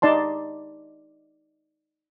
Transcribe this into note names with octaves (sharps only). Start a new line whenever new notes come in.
D#4 D5 A5 C6